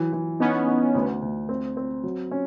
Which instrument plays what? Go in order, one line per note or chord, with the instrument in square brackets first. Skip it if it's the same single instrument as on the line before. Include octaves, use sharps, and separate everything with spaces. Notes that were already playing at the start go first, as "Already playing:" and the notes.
Already playing: [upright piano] E3 F#3
E3
[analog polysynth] B3 C#4 [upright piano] D#4
[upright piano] D#4
D2
D2
C4
C4
F#3
C#4